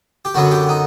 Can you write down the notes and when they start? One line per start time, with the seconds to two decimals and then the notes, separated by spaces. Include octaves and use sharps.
0.25 G4
0.34 F#2 D3 F#3 B3 F#4
0.51 G4
0.69 D#4